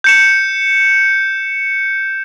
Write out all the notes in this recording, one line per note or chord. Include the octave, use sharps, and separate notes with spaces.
G6 C#7 E7